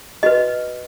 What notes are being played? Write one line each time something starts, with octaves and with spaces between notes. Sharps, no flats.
F#4 B4 D#5